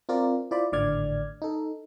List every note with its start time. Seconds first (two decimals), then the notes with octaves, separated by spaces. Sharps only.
0.09 C4 F4 A#4 D5
0.51 E4 F4 C5 D5 B5
0.72 G#1 A2 D3 D5 F6 G#6
1.42 D#4 A4